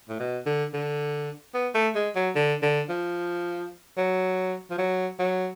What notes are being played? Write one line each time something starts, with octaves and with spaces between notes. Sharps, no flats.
A2
B2
D3
D3
B3
A3
G#3
F#3
D3
D3
F3
F#3
F3
F#3
F#3